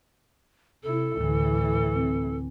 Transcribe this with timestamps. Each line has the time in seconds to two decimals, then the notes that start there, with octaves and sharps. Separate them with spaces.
0.83 C3 E4 A4
1.17 D2 A2 D3 E3
1.95 C4